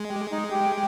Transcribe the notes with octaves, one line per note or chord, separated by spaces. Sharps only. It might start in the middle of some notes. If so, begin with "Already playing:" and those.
Already playing: G#3
G4 G5
D#4 D#5
G4 G5